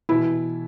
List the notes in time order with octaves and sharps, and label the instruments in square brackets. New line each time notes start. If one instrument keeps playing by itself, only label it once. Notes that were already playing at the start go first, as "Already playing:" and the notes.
[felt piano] B2 E3 E4